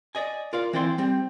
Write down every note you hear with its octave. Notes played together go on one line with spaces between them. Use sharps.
D5 D#5 G#5
F4 A#4 D5 F5
E3 C4 E4 D5 G5 C6
G3 C4